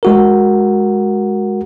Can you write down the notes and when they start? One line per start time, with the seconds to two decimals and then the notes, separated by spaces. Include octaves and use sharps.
0.03 G#3 F#4 A#4